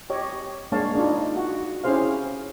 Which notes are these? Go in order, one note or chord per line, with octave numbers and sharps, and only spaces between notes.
G4 C#5 D#5
G#3 A#3 D4 C#5 F5 A5
D4 D#4 F4
F#4
C#4 E4 G4 G#4 C5 F5